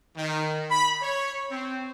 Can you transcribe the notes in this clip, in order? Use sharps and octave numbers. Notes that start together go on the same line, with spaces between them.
D#3
B5
C#5
C4